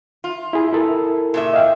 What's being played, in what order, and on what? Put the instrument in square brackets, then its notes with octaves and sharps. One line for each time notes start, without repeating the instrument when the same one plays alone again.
[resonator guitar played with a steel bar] F4
[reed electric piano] E4 G#4
E4 A4 A#4
[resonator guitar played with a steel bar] A#2 C#3 E5
[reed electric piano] D#5 F5 G5